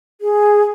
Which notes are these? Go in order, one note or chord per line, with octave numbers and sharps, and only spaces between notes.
G#4